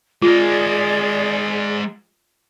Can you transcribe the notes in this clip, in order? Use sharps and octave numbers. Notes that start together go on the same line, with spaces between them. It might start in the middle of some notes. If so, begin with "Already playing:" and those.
G#3 F4 G#4 A#4 D5